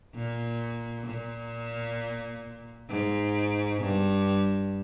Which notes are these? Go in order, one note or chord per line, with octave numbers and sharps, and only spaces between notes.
A#2
A#2
G#2
G2